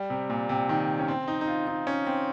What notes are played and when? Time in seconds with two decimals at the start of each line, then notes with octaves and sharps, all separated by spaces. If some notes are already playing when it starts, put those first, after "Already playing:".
Already playing: G3
0.10 C3
0.30 A#2
0.49 C3
0.69 D#3
0.99 C#4
1.08 C4
1.28 D#4
1.41 D#4
1.47 F4
1.67 D#4
1.87 C#4
2.06 C4